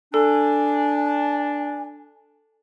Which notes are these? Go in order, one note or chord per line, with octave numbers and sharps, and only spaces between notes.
D4 A4 G#5